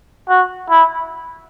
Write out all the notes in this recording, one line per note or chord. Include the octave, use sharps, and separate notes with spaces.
F#4
E4